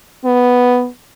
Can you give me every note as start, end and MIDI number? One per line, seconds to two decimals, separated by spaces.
0.25 0.88 59